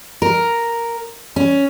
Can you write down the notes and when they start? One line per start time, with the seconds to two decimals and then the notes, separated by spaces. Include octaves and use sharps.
0.22 A#4
1.36 C#4